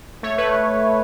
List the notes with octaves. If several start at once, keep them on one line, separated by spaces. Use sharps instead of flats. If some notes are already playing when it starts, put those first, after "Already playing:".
A3 C#5
A3 B4